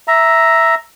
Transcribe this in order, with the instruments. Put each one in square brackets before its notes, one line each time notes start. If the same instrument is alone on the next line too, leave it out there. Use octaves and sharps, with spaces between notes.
[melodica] E5 A#5